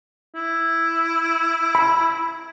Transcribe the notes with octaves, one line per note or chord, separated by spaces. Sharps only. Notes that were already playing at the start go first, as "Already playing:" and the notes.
E4
B5